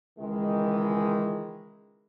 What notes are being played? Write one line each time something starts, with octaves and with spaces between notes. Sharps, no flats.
C#2 D#3 E3 G#3